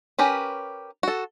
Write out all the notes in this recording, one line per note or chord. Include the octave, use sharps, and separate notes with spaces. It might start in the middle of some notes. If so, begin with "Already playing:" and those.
C#4 G4 A#4 B4
F#4 A4